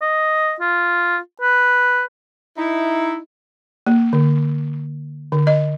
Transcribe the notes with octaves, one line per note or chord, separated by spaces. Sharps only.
D#5
F4
B4
D#4 E4
A#3
D3
D3
D#5